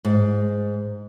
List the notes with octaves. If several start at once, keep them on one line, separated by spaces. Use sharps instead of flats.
G#2